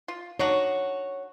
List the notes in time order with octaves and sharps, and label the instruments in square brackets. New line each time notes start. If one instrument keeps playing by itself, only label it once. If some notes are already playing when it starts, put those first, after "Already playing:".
[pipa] F4
[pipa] D4 D#4 F#4 [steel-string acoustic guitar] C#5